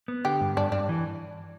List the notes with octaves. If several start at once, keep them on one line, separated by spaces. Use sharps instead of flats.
B3
D3 G4
G2
G2 D4
G2 D4
E3